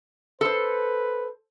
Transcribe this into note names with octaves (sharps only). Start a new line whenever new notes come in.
A4 B4 C5